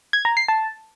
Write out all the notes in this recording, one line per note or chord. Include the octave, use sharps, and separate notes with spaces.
G#6
A#5
C7
A5